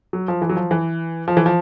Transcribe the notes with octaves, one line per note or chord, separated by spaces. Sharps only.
F#3
F3
E3
F#3
F3
E3
F3
E3
F3